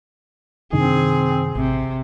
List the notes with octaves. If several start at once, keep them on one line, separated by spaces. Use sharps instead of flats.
F#2 C3 D#3 C4 D4 G#4
A1 C3